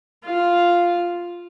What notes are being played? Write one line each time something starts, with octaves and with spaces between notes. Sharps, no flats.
F4 F5